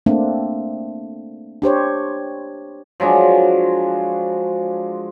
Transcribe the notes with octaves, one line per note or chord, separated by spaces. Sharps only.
A3 A#3 C4 D4
D4 G4 C5 C#5
F3 F#3 G#3 D4